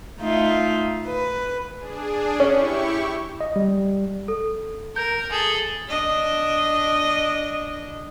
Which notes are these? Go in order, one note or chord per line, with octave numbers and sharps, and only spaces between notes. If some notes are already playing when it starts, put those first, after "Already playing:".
A3 D#4 F4 E5
B4
D4 G#4
C#4 E4 G4 C#6
D#5
G3
A4
A#4 G6
G#4 A4
D4 D#5